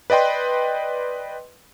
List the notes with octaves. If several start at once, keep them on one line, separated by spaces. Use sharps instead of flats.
B4 D5 D#5 G5 C6